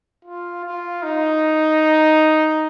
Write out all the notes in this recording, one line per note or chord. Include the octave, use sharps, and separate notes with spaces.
F4
F4
D#4